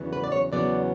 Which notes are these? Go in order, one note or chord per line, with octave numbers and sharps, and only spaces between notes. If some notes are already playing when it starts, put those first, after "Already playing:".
Already playing: E2 C#3 F#3 B3
B4
D5
C#5
E2 C#3 F#3 B3 D5